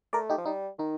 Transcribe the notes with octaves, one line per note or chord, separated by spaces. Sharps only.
A3 A#4 D5
D#4 G4
F3
G3 D#4
D#3 D#4